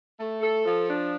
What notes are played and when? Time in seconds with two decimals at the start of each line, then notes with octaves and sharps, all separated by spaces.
0.18 A3
0.41 A4
0.65 F3
0.88 D4